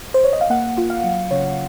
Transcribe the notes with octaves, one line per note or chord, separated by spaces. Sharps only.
C5
C#5
D#5
F5
A#3 F#5
F4
F5
F#3
C#3 C#5